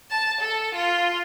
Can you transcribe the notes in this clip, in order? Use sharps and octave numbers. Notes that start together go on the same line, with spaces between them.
A5
A4
F4